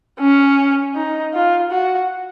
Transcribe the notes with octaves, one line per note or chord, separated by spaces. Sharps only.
C#4
D#4
F4
F#4